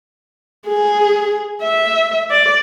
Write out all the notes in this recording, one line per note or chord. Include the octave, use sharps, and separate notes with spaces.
G#4
E5
D5